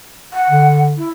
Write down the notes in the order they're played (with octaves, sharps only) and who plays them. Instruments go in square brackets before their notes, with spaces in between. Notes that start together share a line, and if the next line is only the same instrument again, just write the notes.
[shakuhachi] F#5
[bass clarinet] D3
[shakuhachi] E4